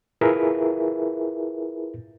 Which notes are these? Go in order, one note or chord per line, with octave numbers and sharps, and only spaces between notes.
E4 F4 G#4 A#4 B4 E5